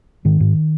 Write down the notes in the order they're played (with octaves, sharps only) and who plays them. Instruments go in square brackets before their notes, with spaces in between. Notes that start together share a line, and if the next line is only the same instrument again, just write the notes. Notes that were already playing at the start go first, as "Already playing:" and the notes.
[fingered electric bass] G#2 D#3
G#2